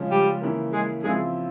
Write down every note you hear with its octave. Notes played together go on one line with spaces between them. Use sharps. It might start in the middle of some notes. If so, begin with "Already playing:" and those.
Already playing: C#3 F3 G#3 C#4
G3 G4
C#3 E3 A#3
G#3 G#4
C#3 F3 G#3 C4 E4 G#4